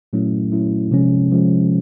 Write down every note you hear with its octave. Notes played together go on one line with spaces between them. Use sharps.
A#2 F#3 A3 C#4 E4
A#2 F#3 A3 C#4 E4
C3 F3 G#3 C#4
C3 F3 G#3 C#4